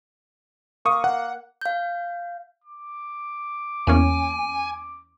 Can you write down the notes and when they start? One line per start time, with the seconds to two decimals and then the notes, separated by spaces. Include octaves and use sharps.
0.86 A#3 C#6 D#6
1.04 F#5
1.61 F5 G6
2.64 D6
3.87 E2 A#3 C#4 G#5